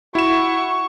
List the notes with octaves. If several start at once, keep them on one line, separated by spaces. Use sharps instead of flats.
E4 F#4 C#6 E7